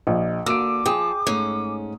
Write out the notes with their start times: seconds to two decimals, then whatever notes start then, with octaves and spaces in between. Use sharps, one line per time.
0.07 A#1 D#5
0.46 D3 A#3 F#4 D6 E6 D7
0.86 F3 G#4 G5 D#6
1.27 G#2 A3 C#4